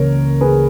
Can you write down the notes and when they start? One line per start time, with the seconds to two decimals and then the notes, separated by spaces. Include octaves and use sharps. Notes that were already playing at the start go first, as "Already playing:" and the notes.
Already playing: C#2 C#3 E3 A#3 A#4 C#5
0.41 G#4 B4